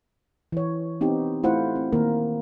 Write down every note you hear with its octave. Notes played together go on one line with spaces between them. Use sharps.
E3 C#5
B3 C4 D#4 G4
A3 E4 F4 C5 F#5
C4
D#3 A#3 A#4